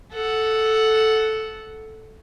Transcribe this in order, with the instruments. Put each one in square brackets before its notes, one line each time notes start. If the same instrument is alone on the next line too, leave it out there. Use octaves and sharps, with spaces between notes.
[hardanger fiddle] A4 F#5